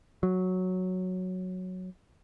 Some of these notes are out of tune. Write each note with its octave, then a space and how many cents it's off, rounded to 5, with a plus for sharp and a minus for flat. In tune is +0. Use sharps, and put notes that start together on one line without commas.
F#3 -5